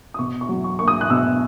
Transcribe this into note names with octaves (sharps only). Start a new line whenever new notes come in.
D#6
B2 C#6
C#6
F#3
C#6
A#3 C#6
D#6
F#6
B2 E6